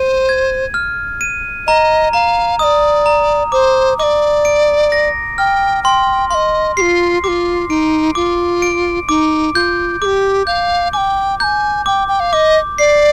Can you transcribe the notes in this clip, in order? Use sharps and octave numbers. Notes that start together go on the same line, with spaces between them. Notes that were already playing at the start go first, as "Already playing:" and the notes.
Already playing: C5 D#7
G#6
F6
D#7
D#5 A#5
F5 A#5
D5 D#5 D#6
A#5
C5 D6
D5 D#5 D6
D7
A#6
G5 F6
G5 C6
D#5 F5 C6
F4 G4 C7
F4 G4 D6
D#4 D7
F4 D6
D7
D#4 D6
F4 G6
G4 G#4 D6
F5 G6
G5 G#5 D6
G#5 A#5 G6
G5 D6
G5
F5
D#5 D6
D5 C7